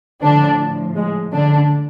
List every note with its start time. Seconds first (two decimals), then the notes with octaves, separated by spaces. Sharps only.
0.23 A2 D3 F3 D4
0.96 G#3
1.33 D3 D4